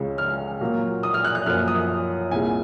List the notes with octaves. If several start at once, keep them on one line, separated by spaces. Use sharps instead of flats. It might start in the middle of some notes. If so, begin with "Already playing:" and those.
Already playing: C#2 C#3 G#3
F6
A#2 F#3 A#3
D#6
F6
F#6
F#6
F#2 F3 A#3 F6
D#6
C2 A#2 G#3 G#5